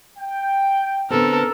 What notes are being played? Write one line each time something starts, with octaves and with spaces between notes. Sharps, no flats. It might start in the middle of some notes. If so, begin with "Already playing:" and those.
G5
D3 B3 C4 A4 A#4